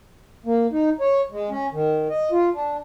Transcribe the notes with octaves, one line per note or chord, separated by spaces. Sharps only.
A#3
D#4
C#5
G#3
C#4
D#3
D#5
F4
D4